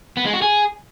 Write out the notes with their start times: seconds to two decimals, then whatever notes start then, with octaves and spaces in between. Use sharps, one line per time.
0.17 B3
0.25 G#3
0.34 F#4
0.42 G#4